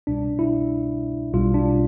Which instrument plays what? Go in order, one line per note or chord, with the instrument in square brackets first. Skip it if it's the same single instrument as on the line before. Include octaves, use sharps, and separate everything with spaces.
[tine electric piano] C2 B2 G3 D4
E4
B1 B2 G3 F4
D4